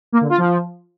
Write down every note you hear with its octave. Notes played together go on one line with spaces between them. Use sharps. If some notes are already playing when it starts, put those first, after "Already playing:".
A#3
D3
F4
F3